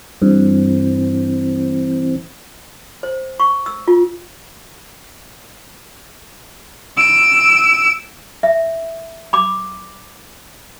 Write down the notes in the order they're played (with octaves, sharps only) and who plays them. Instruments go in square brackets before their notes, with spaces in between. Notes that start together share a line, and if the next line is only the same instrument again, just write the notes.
[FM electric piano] G2 [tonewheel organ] E3 C4
[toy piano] C5
C#6
E6
F4
[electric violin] E6 D7
[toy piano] E5
B5 D6